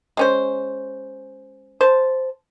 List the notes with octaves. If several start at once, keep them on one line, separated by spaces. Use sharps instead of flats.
G#3 C#4 C5
C5 A5